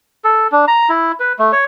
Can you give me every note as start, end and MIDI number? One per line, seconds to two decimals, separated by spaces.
0.24 0.47 69
0.52 0.65 62
0.68 0.89 82
0.89 1.12 64
1.20 1.33 71
1.39 1.52 57
1.52 1.65 73